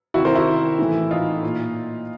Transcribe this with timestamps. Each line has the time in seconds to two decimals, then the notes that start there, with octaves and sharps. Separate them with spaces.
0.14 D#3 E4 F#4
0.18 C3
0.25 A#4 C5
0.36 E4 F#4
0.79 A2 E3
1.11 D#4 F4
1.43 A#2